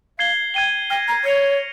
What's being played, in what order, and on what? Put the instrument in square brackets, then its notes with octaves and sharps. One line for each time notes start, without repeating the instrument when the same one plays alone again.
[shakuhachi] F5 [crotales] G#6 C7 G7
[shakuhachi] G5 [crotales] G#6 D#7 G7
[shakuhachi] G5 [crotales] F6 A#6 D#7 G7
[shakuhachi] A#5
[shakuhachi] C#5 [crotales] F6 G#6 C#7 F7